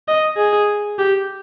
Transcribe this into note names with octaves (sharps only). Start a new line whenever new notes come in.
D#5
G#4
G4